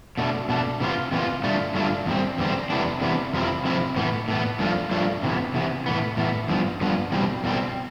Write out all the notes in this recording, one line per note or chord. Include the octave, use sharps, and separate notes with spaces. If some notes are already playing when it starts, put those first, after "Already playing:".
B2 A3 D4
B2 A3 D4
C3 E3 B3 D4 F4
C3 E3 B3 D4 F4
G2 D3 A3 D4 F4
G2 D3 A3 D4 F4
E2 D3 G3 C4
E2 D3 G3 C4
E2 C3 E3 B3 D4
E2 C3 E3 B3 D4
F2 C3 F3 C4 E4
F2 C3 F3 C4 E4
A2 E3 B3
A2 E3 B3
G2 F3 A3 D4 F4
G2 F3 A3 D4 F4
C3 E3 B3
C3 E3 B3
A2 E3 B3
A2 E3 B3
G2 F3 B3
G2 F3 B3
E2 B2 G3 C4
E2 B2 G3 C4